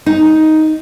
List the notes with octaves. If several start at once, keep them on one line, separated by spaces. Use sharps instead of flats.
D#4